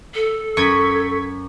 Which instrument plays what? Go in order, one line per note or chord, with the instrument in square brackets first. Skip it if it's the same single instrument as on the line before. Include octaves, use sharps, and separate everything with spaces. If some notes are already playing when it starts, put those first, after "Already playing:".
[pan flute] A4
[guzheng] F#2 [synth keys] C#6 G#6 B6